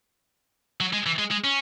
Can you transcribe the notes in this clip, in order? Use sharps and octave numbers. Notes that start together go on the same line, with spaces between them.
F#3
G#3
E3
G#3
G#3
C#4